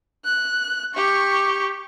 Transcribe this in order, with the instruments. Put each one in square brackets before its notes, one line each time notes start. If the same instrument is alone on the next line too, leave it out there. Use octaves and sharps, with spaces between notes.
[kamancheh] F#6
G4 C#6